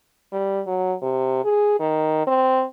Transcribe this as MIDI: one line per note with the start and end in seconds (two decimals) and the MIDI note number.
0.32 0.61 55
0.67 0.94 54
1.02 1.43 48
1.45 1.79 68
1.80 2.24 51
2.27 2.64 60